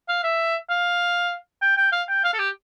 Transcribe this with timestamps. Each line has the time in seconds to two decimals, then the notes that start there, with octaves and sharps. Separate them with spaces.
0.09 F5
0.23 E5
0.70 F5
1.62 G5
1.77 G5
1.92 F5
2.08 G5
2.24 F5
2.33 A4
2.38 G4